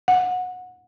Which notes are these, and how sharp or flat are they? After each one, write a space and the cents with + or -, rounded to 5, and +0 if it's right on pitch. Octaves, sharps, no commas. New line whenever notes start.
F#5 -20